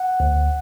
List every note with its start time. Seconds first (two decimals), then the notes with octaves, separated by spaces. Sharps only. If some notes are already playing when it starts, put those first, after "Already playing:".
Already playing: F#5
0.20 D2